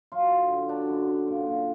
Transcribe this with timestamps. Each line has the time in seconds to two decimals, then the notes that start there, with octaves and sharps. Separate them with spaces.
0.12 F#3 F4
0.31 D3
0.50 D3
0.69 F#3 D4
0.89 F#2
1.07 D3
1.28 A#2
1.46 A#2